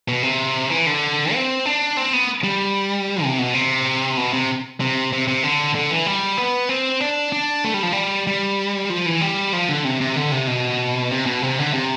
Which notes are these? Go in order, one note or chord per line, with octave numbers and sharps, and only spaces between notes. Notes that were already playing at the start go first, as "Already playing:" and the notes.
B2
C3
E3
D3
C4
D4
C4
B3
G3
C3
B2
C3
B2
C3
C3
C3
C3
D3
D3
E3
G3
B3
C4
D4
D4
A3
G3
F3
G3
G3
F3
E3
G3
F3
D3
C3
C3
D3
C3
B2
C3
B2
C3
D3
C3